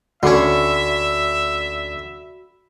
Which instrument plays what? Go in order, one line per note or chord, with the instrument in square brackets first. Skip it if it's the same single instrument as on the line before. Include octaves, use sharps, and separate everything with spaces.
[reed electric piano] D2 D5 [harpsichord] D3 C#4 [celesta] F#4 B5 C7 [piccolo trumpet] E5